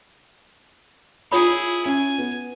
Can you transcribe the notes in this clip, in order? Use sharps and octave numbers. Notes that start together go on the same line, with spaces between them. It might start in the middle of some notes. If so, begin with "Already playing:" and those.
E4 F4 G#4 C#5 B5 D#6
C#4 G#5
B3